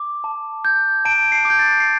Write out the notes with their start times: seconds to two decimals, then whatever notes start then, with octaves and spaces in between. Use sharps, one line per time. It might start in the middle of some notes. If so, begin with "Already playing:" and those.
Already playing: D6
0.24 A5
0.65 G6
1.05 A5 D7
1.32 C7
1.45 D6
1.50 G6
1.59 A6
1.80 C7